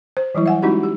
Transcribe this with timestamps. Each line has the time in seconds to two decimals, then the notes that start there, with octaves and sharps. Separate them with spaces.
0.17 C5
0.35 E3 F#3 G3 E4
0.46 E5 F#5 G#5
0.62 G#3 C#4 D#4 E4 F#4 G4
0.83 G4